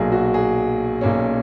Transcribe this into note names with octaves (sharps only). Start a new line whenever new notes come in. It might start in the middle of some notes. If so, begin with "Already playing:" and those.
Already playing: B1 A#2 F#3 G#4
F#4
G#4
B1 A#2 A#3 C#4